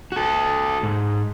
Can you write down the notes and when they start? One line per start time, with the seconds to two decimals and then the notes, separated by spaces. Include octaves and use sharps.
0.12 F#4 A4
0.83 G#2